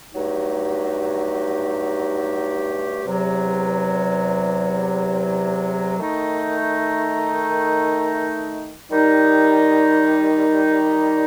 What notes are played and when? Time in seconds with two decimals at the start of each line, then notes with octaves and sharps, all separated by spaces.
0.10 G2 F#3 A3 D#4 G4
3.03 E2 C3 F#3
5.97 D#3 A3 D#4
8.90 D#3 G3 D#4